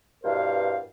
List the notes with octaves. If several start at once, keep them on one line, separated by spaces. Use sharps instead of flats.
G2 B2 E3 A#4 C5 F5